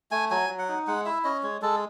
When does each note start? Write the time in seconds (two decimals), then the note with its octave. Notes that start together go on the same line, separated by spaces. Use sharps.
0.11 A3 G#5
0.31 F#3 G#5
0.50 F#3
0.59 F#5
0.69 D#4
0.87 G#3 F#5
1.05 E4 E5
1.24 C#4 D#5
1.43 G#3 C#5
1.62 G#3 A4